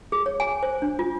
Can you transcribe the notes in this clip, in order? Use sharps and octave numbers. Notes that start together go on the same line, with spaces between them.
G#4
C#5
G#5
C5
D4
F4